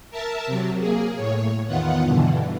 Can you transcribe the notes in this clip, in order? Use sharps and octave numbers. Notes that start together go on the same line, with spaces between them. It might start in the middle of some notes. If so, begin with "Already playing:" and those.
A#4 E5 A5
C3 F#3
A#3 G#4
A2 C#5
E2 D#3 B3 F4 F#5
G2 B2 D3 E3